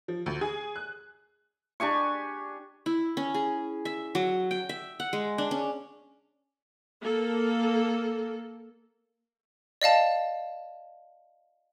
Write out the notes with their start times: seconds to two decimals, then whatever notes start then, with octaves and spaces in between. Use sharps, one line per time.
0.08 F3
0.26 D2
0.41 G#4
0.76 F#6
1.80 D4 G4 G#5 C#6
2.86 E4
3.17 C#4
3.34 G#4
3.85 E5
4.15 F#3
4.51 G5
4.69 E5
5.00 F#5
5.13 G#3
5.38 D4
5.51 C#4
7.02 A#3 A4
9.82 D5 D#5 F5 A5